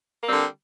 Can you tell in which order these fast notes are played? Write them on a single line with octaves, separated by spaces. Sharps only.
A#3 G3 C4 D3